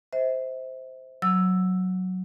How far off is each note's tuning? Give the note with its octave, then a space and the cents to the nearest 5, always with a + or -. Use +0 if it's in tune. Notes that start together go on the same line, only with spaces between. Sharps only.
C5 -5 E5 -40
F#3 +0 E6 +0